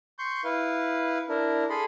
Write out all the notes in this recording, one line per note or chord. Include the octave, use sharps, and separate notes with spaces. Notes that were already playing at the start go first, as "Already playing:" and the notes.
C6 C#6 G6
E4 B4 F5
D4 E4 A#4
G#4 A4 B5 C6